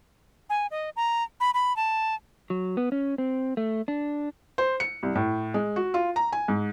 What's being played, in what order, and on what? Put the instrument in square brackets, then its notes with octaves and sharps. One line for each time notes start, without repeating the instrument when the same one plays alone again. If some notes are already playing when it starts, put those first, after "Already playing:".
[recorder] G#5
D#5
A#5
B5
B5
A5
[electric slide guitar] F#3
B3
C#4
C4
A3
D4
[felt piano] C5
C#7
C2
A2
G#3
F#4
F4
A#5
G#5
G#2